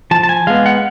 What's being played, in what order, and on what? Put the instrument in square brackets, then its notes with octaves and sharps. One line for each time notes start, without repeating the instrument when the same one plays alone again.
[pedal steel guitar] F3 A5
A5
G#5
G#3 B3 F5
F#5